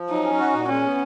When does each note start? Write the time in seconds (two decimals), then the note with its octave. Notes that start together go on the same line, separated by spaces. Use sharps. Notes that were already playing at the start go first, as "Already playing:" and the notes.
Already playing: F3
0.09 F#3 D#4
0.24 C#4
0.39 F#4
0.54 A#2
0.68 G#3 C#4
0.84 B3